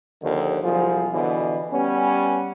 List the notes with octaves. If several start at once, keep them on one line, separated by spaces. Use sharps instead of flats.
D#2 D3 D#3 F3
C2 F3 F#3 G#4
B2 D3 E3
G3 B3 C#4